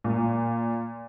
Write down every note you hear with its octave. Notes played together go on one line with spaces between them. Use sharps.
A#2